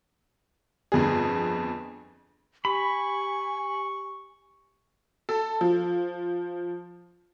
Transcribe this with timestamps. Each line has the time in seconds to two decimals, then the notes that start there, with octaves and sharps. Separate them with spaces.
0.92 G1 F2 G#4
2.65 G4 G#5 B5 C#6
5.29 A4
5.61 F3